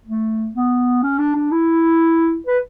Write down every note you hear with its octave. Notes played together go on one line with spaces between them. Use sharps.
A3
B3
C#4
D4
D4
E4
B4